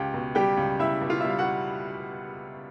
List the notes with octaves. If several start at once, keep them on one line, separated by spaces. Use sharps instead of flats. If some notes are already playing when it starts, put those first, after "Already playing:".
Already playing: C#2 G4 G5
B2
G3 G4 G5
C#2
C#2 E4 E5
B2
F4 F5
G3 E5
F5
F#4 F#5